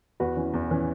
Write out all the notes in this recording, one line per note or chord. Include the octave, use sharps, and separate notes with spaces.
E2 F#4 B4
E3 C#4
E2
E3 C#4